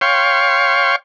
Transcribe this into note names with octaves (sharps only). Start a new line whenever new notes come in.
C#5 F5 G5 C6 C#6